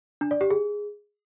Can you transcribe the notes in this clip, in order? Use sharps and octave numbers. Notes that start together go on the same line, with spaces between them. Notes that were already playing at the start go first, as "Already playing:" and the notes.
D4
D5
G4
G#4